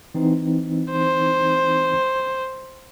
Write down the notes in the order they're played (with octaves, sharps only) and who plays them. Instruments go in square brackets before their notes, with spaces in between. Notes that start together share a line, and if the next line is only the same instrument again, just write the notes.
[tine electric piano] E3 C4 D#4
[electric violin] C5